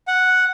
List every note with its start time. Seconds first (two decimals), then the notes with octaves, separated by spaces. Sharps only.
0.08 F#5